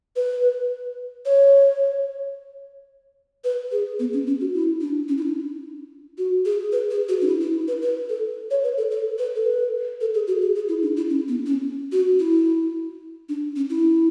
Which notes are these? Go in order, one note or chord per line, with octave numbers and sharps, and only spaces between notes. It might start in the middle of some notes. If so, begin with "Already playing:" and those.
B4
C#5
B4
G#4
B3
C#4
C#4
F#4
E4
D4
C#4
E4
D4
F#4
G#4
B4
G#4
F#4
D4
E4
E4
B4
B4
A4
C#5
B4
A4
A4
B4
A4
B4
A4
G#4
F#4
G#4
G#4
E4
D4
E4
C#4
B3
C#4
F#4
E4
D4
C#4
E4